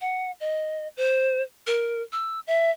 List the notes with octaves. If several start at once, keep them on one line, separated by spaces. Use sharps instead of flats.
F#5
D#5
C5
A#4
E6
E5